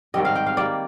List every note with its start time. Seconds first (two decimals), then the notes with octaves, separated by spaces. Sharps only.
0.14 G#2 D#3 G3 C4 D#5
0.25 F5
0.36 G5
0.46 F5
0.57 D#3 G3 A#3 D5